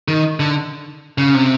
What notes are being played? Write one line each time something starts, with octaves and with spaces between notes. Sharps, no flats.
D#3
D3
C#3
C3